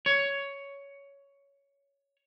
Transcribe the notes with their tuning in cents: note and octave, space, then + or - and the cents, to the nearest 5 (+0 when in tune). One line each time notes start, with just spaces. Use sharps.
C#5 +10